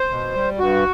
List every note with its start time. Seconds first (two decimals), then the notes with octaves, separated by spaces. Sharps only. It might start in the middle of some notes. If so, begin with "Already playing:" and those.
Already playing: C5
0.09 B2
0.34 G3
0.59 G2 F#4